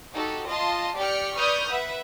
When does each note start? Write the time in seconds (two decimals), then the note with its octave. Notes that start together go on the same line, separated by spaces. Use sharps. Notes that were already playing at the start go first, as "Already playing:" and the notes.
0.14 D#4 F#4 G4 A4
0.47 F4 D#5 F5 A5 C6
0.96 G4 D5 G5 F6 C#7
1.36 B4 D5 C#6 D#6 F6 G6
1.69 B4 E5 F#5